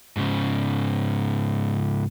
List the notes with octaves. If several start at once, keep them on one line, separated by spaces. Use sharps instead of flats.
G#2 C#3